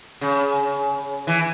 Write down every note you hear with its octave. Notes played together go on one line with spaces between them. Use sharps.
C#3
E3